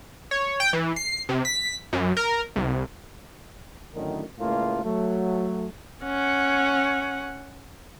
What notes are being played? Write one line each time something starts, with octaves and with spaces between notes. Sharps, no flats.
C#5
G5
E3
C7
C3
B6
F#2
A#4
C2
F#2 A2 D3 D#3
C#2 A2 A3 A#3 F4
F#3 A3
C#4 F#5